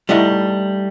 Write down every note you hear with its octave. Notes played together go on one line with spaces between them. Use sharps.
G3 A3 D#4 E4 F#5